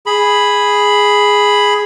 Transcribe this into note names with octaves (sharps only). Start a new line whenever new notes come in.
G#4 B5